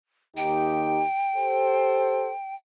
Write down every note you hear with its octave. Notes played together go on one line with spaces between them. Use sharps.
D#2 D#4 G4 G5
G4 A4 C5